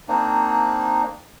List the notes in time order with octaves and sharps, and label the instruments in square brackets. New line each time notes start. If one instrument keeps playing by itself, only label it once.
[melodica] A#3 C4 D4 D#4